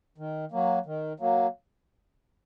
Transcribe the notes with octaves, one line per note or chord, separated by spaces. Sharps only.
D#3
F#3 A#3
D#3
F#3 A#3